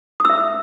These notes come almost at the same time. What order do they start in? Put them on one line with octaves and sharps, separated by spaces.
D#6 E6 E5